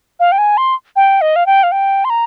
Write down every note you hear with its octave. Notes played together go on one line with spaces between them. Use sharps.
F5
G5
G#5
C6
G5
D#5
F5
G5
F5
G5
C6
A#5